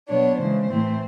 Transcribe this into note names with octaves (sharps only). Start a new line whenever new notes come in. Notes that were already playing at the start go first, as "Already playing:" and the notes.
B2 F#3 B3 D4 C#5
C#3 E3 G#3 C5
A2 E3 A3 C4